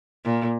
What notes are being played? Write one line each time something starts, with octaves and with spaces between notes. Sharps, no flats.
A#2